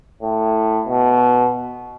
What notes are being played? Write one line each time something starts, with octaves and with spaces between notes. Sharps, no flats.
A2
B2